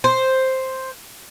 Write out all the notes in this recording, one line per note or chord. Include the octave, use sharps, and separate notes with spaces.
C5